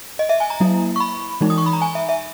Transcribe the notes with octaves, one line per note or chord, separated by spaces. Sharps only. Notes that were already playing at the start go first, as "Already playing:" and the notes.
D#5
E5
G#5
A#5
F#3 A#3 E4
C#6
B5
E3 G#3 D#4
D#6
C#6
B5
A#5
G#5
E5
E5